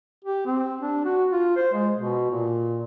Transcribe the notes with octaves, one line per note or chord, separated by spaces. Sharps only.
G4
C4
D4
F#4
F4
C5
G#3
B2
A#2